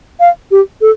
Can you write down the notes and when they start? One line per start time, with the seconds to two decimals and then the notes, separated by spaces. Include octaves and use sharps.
0.20 F5
0.51 G4
0.81 A4